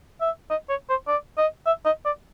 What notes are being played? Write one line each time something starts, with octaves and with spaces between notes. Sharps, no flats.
E5
D#5
C#5
C5
D5
D#5
E5
D#5
D5